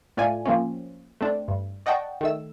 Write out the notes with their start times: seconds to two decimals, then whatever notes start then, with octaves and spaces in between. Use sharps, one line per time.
0.17 A2 A3 F4 D5 G#5
0.46 F3 A#3 C4 C#4
1.21 A3 C4 D4
1.48 G2
1.86 D5 D#5 F#5 G5 A5 C#6
2.21 D#3 A3 E6